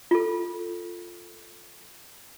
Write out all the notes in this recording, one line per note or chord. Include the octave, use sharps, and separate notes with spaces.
F4 A4